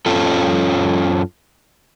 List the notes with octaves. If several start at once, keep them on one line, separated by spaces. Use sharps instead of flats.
F#2 C#4 F4 A4